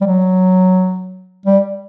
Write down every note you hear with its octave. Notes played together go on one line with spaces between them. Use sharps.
G3
F#3
G3